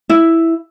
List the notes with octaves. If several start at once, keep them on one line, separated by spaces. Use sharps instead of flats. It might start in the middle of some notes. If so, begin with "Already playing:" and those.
E4